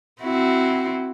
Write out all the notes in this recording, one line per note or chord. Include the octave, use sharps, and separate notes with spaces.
C4 E4 F#4